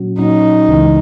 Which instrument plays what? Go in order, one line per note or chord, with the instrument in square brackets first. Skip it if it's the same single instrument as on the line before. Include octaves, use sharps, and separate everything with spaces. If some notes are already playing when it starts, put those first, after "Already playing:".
Already playing: [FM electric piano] A#2 F#3 C#4 F#4
[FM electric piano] A#2 F#3 C#4 F#4 [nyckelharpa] D#4
[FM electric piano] C#2 C#3 E3 G#3